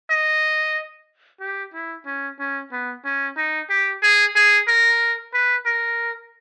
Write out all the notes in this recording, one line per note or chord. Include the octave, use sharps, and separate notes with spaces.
D#5
G4
E4
C#4
C#4
B3
C#4
D#4
G4
G#4
G#4
A#4
B4
A#4